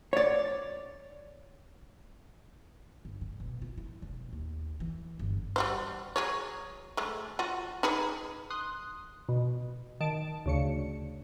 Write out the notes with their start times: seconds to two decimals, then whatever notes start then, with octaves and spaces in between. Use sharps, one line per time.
0.13 C#5 D5
3.05 G1
3.21 G#2
3.40 B2
3.62 F4
3.77 E4
4.02 E1
4.33 D#2
4.80 E3
5.19 G1
5.56 G3 F#4 C5
6.16 F#3 G#4 C#5
6.97 G#3 A3
7.39 F4 F#4
7.83 D#4 G#4 B4
8.50 C6 D#6 F#6
9.29 B2
10.01 D#3 A5 D7
10.46 D2 C#3 C#7